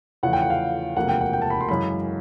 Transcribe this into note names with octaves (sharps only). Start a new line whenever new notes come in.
E2 C#3 F3 A3 F#5
G5
F#5
F5
E1 D2 C3 F3 A#3 F#5
G5
F#5
G5
A5
B5
C6
F#2 C#3 E3 G#3 B5